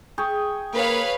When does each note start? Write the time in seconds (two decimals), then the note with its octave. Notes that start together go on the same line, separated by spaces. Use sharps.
0.18 G#4 G5 C#6
0.74 A#3 B4 C#5 F5